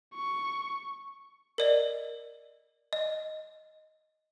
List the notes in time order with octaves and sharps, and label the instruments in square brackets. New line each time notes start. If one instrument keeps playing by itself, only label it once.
[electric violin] C#6
[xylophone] A#4 D5 D#5
D#5